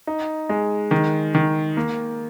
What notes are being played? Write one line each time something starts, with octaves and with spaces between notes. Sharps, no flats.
D#4
G#3
D#3
D#3
A#3